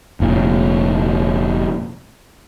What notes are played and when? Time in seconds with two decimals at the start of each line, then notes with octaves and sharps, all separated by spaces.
0.20 F1 A#2